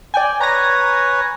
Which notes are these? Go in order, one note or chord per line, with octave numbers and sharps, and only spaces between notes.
D5 G5 G#5
B4 C#5 G#5 A#5 A#6